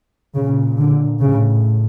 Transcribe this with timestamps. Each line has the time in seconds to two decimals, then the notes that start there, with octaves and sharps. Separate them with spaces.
0.35 A#2 C#3
0.78 D3
1.21 A2 C#3